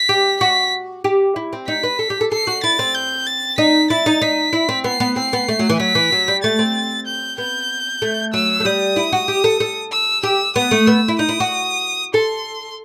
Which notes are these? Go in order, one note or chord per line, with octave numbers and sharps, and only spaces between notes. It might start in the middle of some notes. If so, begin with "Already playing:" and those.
Already playing: B6
G4
F#4 B6
G4
E4
C4
D#4 B6
B4
A4
G4
A4
A4 C7
F#4
E4 A6
C4
G6
A6
D#4 B6
E4 A6
D#4
D#4 B6
E4
C4
B3 C7
B3
C4 C7
B3
A3
F#3
E3
F#3 B6
E3
F#3
G3
A3 A6
C4
G6
B3 G6
A3
F#3 E6
A3
G3 D#6
E4
F#4
G4
A4
A4
E6
G4 E6
B3 D#6
A3
B3 E6
E4
D#4 D#6
E4
F#4
A4 C6